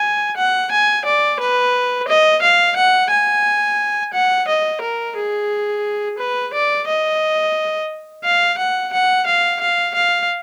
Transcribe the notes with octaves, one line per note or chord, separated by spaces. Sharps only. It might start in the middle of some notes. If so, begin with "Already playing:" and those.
Already playing: G#5
F#5
G#5
D5
B4
D#5
F5
F#5
G#5
F#5
D#5
A#4
G#4
B4
D5
D#5
F5
F#5
F#5
F5
F5
F5